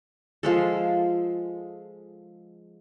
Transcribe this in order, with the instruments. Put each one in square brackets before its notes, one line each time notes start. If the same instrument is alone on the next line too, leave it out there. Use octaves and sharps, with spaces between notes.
[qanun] F3 G#3 A4